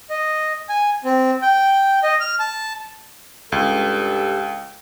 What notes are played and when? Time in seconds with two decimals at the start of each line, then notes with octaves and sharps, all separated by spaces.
0.10 D#5
0.69 G#5
1.04 C4
1.42 G5
2.03 D#5
2.20 F6
2.40 A5
3.52 C#2 G2 G3 A4